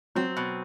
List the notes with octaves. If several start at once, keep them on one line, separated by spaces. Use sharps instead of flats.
F#3 C4
B2